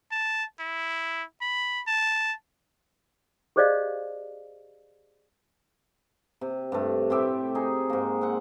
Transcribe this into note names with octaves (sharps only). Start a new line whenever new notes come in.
A5
E4
B5
A5
G4 G#4 C5 D5 D#5 F5
C3
G2 A3
A2 C4 G4 E5
D#4 G#4
G#2 A#3
C4 F#5